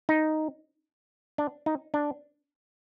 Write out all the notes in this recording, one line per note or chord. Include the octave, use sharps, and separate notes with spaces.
D#4
D4
D#4
D4